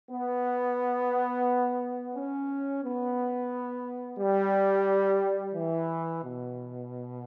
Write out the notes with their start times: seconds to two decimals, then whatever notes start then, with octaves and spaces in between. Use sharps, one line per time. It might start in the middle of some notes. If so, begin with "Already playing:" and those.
0.10 B3
2.15 C#4
2.83 B3
4.18 G3
5.54 E3
6.23 B2